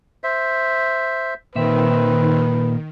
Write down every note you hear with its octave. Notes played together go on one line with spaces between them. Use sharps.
C5 E5
A#2 D#3 C4 B4 E5